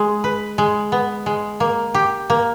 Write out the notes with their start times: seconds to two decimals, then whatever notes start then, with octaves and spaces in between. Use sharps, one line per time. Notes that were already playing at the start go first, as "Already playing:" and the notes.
Already playing: G#3
0.24 B4
0.58 G#3
0.92 B3
1.26 G#3
1.60 A#3
1.94 G4
2.30 A#3